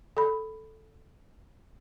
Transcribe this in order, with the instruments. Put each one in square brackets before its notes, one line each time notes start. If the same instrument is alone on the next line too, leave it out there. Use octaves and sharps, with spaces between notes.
[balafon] A4 B5